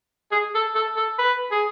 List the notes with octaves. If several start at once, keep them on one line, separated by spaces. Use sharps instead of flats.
G#4
A4
A4
A4
B4
G#4